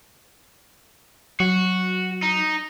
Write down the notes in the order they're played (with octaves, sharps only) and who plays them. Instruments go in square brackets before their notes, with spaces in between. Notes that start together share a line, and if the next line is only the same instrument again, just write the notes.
[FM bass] F#3 [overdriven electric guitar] F#4
[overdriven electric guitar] D#4